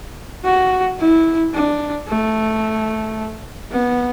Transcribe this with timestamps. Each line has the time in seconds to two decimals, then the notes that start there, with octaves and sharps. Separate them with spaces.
0.44 F#4
0.99 E4
1.54 D4
2.08 A3
3.72 B3